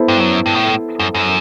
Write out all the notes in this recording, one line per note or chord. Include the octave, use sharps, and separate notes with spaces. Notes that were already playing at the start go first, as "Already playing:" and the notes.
Already playing: B3 E4 A4 C5
G2
F#2
G2
A2
F#2
F#2